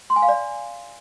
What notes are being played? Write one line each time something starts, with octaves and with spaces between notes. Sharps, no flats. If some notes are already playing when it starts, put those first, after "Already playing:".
C6
G#5
F5
D5